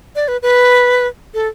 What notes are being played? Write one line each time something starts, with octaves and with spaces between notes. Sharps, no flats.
D5
B4
B4
A4